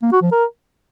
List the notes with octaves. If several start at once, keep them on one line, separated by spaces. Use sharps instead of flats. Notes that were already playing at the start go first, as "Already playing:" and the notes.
A#3
F#4
F3
A#4